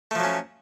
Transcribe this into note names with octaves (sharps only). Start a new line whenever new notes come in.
F3 F#3 A3 C#4